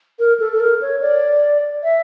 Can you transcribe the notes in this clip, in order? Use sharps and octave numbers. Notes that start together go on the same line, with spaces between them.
A#4
A4
A4
A#4
C#5
D5
E5